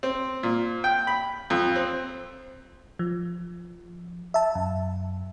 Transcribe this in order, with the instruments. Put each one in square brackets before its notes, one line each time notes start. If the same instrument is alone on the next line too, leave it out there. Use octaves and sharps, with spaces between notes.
[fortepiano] C4
A#2
G5
B5
F2
C4
[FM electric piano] F3
E5 A5
F#2